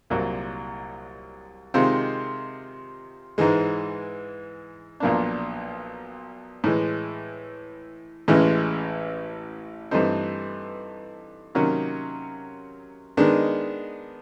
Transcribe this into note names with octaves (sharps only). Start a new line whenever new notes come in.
C2 A#2 F#3 A#3
C3 D#3 G#3 C4 F4
G#2 E3 G#3
B1 A#2 F3 A#3 D4
A2 E3 G#3
A1 A2 E3 G#3 C#4
G2 E3 A3 C4 D#4
C3 D#3 F#3 A#3 C#4
D#3 G#3 B3 D4